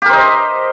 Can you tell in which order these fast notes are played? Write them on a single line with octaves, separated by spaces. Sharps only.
G4 A#4 C5 D#5